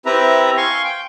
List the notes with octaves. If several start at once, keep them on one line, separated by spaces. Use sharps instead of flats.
C4 E4 G4 B4 E5 A#5
F5 G#5 C6 C#6
G5